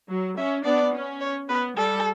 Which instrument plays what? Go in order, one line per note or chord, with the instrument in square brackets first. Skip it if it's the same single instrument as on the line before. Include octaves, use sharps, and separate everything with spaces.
[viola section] F#3
[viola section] C#4 [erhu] E5
[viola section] B3 D4 [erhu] D5
[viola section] C#4
[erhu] C#5
[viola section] B3 [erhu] B4
[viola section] G3 [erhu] A4